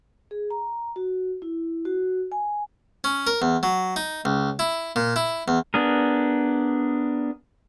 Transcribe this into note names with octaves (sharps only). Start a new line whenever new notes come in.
G#4
A#5
F#4
E4
F#4
G#5
C#4
A#4
E2
F#3
D#4
C#2
E4
A#2
E4
E2
B3 D4 G#4 A#4